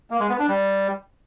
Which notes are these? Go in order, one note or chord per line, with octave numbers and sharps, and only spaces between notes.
A#3
G#3
B3
D4
G3